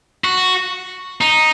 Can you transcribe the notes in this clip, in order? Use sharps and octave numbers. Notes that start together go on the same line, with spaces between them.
F#4
D#4